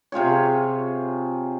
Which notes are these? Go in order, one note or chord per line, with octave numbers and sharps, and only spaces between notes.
C3 F4 G#4 C#5